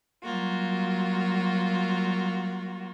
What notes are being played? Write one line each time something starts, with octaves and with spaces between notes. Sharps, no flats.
F#3 G3 A#3 F4 F#4